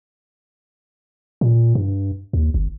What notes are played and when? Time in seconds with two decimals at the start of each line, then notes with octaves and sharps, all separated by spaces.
1.41 A#2
1.75 G2
2.33 D#2
2.54 G1